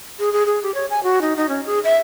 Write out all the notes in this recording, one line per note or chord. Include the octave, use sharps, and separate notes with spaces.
G#4
G#4
G#4
G4
C#5
G#5
F#4
D#4
D#4
C#4
G#4
E5